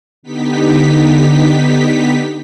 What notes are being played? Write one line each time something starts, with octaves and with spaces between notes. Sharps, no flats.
D3 B3 D#4 G4 B6